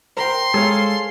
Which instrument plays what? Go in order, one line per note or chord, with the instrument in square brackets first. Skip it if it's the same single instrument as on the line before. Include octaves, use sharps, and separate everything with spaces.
[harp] A#4 G5 [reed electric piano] C5 A#5 [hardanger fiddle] C6
[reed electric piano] G#3 [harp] G#4 C#5 [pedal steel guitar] A4 F5